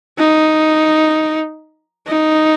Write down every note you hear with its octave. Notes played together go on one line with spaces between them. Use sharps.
D#4
D#4